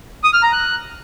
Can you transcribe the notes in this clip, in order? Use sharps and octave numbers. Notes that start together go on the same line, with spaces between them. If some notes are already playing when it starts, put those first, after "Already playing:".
D#6
F6
A#5
F#6